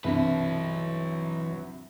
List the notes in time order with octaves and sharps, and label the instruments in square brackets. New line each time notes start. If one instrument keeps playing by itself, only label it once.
[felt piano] C2 G2 C3 [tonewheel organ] E3 [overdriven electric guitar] F#3 B4